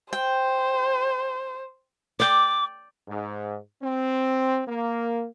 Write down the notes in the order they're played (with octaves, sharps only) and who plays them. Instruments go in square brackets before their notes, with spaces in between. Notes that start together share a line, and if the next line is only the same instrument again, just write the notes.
[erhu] C5 [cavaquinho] G5
[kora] D5 G5 [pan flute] D6
[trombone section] G#2
C4
A#3